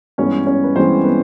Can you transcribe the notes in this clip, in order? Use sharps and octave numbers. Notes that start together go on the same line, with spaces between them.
G2 E3 G#3 B3 C#4 C#5
C#4 C#5
B4
G2 E3 G#3 B3 C4 C5
B3 B4